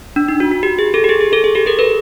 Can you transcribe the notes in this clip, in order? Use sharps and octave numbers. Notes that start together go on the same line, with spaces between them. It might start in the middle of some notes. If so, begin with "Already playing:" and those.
D4
D#4
F#4
F#4
G4
G#4
G4 A4
G4
G#4
G#4
G4 A4
G#4
G4 A4
G#4 A#4
A4 B4